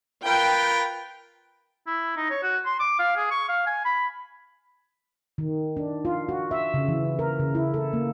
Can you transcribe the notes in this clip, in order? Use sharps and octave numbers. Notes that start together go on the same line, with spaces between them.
F4 A#4 B4 G5
E4
D#4
C#5
F#4
C6
D6
F5
G#4
C#6
F5
G#5
B5
D#3
D4
F4
F#4
E5
C#3
E3
A#4
C#3
E4
A4
A#3